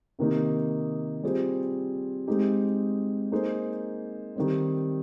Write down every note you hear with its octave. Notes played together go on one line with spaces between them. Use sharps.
C3 D#3 A#3 D#4
G3 C4 F4 G#4 C5
G#3 C4 D#4 G4
A#3 D#4 G#4 C5
D#3 G3 C4